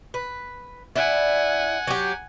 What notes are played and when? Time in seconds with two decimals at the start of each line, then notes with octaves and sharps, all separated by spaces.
0.14 B4
0.96 E4 D5 F#5 G#5
1.87 F#3 G4